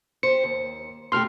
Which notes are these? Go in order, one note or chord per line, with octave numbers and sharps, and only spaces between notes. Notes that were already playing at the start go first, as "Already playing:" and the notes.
G4 C5 C#7
D#2
B2 A3 G4 C6 F6